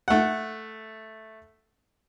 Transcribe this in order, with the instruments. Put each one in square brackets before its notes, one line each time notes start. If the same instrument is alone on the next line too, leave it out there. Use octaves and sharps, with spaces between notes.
[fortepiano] A3 F#5